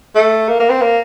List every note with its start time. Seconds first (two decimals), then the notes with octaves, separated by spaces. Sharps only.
0.15 A3
0.48 A#3
0.59 A#3
0.70 C4
0.82 A#3